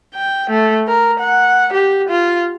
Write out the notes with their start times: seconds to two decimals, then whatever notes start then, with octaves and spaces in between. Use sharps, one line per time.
0.14 G5
0.50 A3
0.88 A#4
1.19 F#5
1.73 G4
2.09 F4